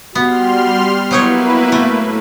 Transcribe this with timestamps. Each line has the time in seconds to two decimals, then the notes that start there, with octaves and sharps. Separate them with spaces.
0.15 G3 B3 F#4 C6 F6
1.11 F#3 A#3 B3 D#4 E4 B4 C#5
1.72 A2 A3